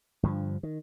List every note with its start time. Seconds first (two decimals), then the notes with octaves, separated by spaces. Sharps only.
0.23 G2 D3 D#3 F3
0.63 D#3